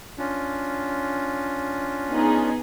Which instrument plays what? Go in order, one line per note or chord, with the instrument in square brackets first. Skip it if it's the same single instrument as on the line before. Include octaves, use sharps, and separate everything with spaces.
[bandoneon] C#4 D4 F4
[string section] B3 D#4 G#4